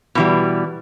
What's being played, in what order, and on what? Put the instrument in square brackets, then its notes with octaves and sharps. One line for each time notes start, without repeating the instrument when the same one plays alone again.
[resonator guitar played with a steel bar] B2 E3 G3